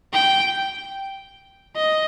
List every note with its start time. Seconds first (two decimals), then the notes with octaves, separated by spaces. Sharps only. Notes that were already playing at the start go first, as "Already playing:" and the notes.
0.13 G5
1.76 D#5